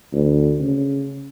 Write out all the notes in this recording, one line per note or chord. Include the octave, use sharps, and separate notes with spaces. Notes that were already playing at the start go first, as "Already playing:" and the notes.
D2
C#3